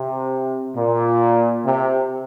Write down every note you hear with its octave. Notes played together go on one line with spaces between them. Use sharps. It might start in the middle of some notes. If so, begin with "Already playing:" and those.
Already playing: C3
A#2
C3